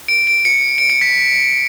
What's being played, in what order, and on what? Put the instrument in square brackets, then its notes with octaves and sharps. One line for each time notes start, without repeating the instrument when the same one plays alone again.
[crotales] D7
D7
C#7
D7
C#7
B6